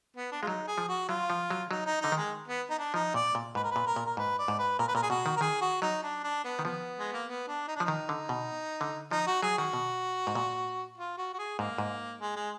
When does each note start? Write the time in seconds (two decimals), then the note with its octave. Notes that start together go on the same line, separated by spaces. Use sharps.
0.17 B3
0.32 D4
0.43 G#3 F4
0.47 F#3 D#4
0.67 G#4
0.78 F3
0.88 F#4
1.09 F#3 F4
1.30 F3
1.50 F#3
1.71 F#3 D#4
1.86 D#4
2.01 D3 D#4
2.12 D#3
2.17 G#3
2.48 B3
2.70 D#4
2.79 D4
2.94 F3 D#4
3.14 A#2 D5
3.35 A#2
3.55 G#2 B4
3.63 A#4
3.71 A#2 B4
3.86 A#4
3.96 A#2
4.05 A#4
4.17 G#2 B4
4.39 D5
4.48 G#2
4.59 B4
4.79 A#2 A#4
4.88 B4
4.95 A#2 A#4
5.03 G#4
5.10 B2 F#4
5.26 D#3
5.36 A#4
5.41 D#3 G#4
5.61 F#4
5.82 F#3 D#4
6.03 D4
6.24 D4
6.44 B3
6.59 D#3
6.64 F3 B3
6.99 G#3
7.13 A#3
7.26 B3
7.48 D4
7.68 D#4
7.76 D4
7.80 F3
7.85 D#3 D#4
8.09 D3
8.29 B2
8.81 D3
9.11 F3 D#4
9.27 F#4
9.42 F#3 G#4
9.58 D#3 F#4
9.73 B2
10.27 G#2
10.35 A#2
10.97 F4
11.17 F#4
11.33 F#4
11.39 G#4
11.59 G#2 A#3
11.78 G#2
12.20 G#3
12.36 G#3